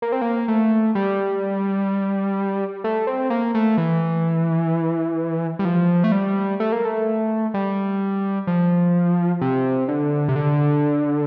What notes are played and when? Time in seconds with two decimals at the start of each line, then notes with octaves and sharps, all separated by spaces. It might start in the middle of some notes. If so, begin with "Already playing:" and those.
0.02 A#3
0.12 C4
0.22 A#3
0.48 A3
0.95 G3
2.84 A3
3.07 C4
3.30 A#3
3.54 A3
3.78 E3
5.59 G3
5.65 F3
6.04 A3
6.12 G3
6.60 A3
6.72 A#3
6.85 A3
7.54 G3
8.47 F3
9.41 C3
9.88 D3
10.28 C3
10.36 D3